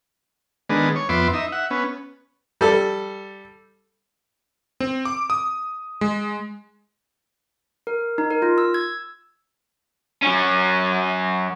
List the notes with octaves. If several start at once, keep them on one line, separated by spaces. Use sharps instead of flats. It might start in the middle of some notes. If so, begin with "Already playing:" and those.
D#3 G#3 B3 D4
C#5
F2 B3 E5 C6 D6
D#4 E5
E5 F#5
B3 C#4
G3 A4
C4
D6
D#6
G#3
A#4
D#4
A#4
F4
E6
G#6
F#3 C#4